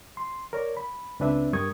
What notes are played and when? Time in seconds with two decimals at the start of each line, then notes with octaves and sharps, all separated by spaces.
0.17 C6
0.53 A#4 C#5 D5
0.77 B5
1.20 C#2 C4 D4 B4 E5
1.53 G2 G3 A#4 C#6 D#6 G#6